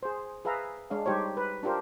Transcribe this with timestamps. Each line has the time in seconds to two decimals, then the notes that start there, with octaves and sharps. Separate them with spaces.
0.03 G#4 C5
0.45 G#4 B4 E5 F5 A#5
0.90 G#3 D4 C#5 F5
1.06 G3 D#4 G4 C5 C#5
1.37 B4
1.63 D4 F4 G4 A#4 C5